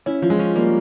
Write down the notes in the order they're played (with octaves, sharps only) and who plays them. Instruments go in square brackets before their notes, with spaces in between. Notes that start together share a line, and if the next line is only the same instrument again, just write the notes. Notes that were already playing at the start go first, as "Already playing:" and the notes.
[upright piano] C#4 [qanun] E4
[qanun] F3
[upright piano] G#3
[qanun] C#4
[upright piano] G3 [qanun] A#3